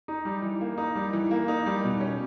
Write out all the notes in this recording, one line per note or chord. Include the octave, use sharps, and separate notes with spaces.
D#4
G3
E3
A#3
D#4
G3
E3
A#3
D#4
G3
B2
C#4